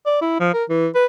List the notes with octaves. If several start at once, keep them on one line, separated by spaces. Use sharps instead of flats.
D5
E4
F3
A#4
E3
B4